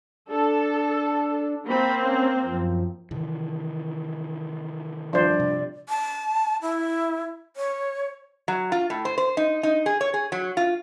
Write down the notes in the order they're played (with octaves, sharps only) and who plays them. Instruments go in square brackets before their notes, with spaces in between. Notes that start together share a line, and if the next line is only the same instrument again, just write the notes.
[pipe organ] D4 [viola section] A4
[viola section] A#3 C4 [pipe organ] B5
[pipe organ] C#4
F#2 F3
[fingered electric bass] C3 D#3 E3
[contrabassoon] G2 [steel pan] F3 C5 [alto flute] D5
[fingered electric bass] C3
[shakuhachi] A5
E4
C#5
[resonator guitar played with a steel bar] F#3
F4
A2
C5
C5
D#4
D#4
G#4
C#5
G#4
F#3
F4